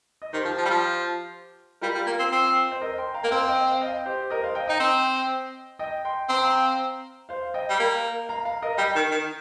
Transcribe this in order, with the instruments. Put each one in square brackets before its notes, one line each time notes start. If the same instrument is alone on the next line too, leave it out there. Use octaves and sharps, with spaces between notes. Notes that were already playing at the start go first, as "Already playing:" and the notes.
[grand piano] D#5
[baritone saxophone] D#3 [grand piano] G4 C5
[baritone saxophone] F3
F3
G3
F3
[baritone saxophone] G3 [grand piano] F4 A#4
[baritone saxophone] G3
A#3
C4
C4
[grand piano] C5
A#4 D#5
G5 C6
F5 A#5
[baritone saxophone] A#3
[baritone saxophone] C4 [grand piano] C5 F5
[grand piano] D#5 G5
F5
D#5 G5
G4 C5
A#4 D#5
C5 F5
D#5 G5
[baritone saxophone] D#4 [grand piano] D#5 G5
[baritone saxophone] C4
[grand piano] D#5 G5
G5 C6
[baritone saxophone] C4 [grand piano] A#5
[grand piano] G5
F5 A#5
C5 F5
D#5 G5
[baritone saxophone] G3
A#3
[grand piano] F5 A#5
F5 A#5
A#4 D#5
[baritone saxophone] G3 [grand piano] D#5 G5
[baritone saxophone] D#3
D#3